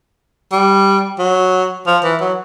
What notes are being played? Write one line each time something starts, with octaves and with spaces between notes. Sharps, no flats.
G3
F#3
F3
E3
F#3